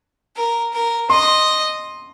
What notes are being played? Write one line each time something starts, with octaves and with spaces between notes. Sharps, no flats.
A#4
A#4
D#5 C6